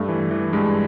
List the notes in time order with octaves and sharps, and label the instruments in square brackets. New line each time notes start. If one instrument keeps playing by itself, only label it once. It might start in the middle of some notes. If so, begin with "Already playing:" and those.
Already playing: [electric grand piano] G2 A3
E3
E3
G2 G#3